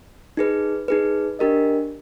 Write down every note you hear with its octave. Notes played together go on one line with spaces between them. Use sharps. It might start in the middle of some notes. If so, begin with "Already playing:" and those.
D#4 G#4 B4
D#4 G#4 B4
D4 G4 A#4 D#5